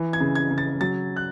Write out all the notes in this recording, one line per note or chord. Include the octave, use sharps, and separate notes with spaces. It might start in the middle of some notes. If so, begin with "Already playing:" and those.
Already playing: E3
G#6
C#3
G#6
C#3
A6
F#3 A6
F#6